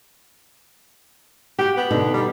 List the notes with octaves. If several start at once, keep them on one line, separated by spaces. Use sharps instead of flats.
F#4 G4 F#5
B3
B2 D3 D#4
G3